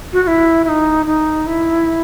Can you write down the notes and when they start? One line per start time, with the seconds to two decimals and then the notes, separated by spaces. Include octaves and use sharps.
0.13 F#4
0.23 F#4
0.27 E4
0.64 E4
0.69 D#4
1.06 D#4
1.47 E4